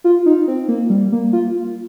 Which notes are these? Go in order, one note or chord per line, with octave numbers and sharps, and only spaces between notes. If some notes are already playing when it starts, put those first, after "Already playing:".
F4
D#4
C4
A#3
G3
A#3
F4